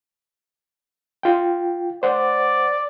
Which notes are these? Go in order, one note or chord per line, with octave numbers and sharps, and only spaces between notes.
F4 G5
C5 D5 F#5